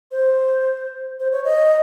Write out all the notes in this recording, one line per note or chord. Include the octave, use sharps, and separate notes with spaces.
C5
C5
C#5
D#5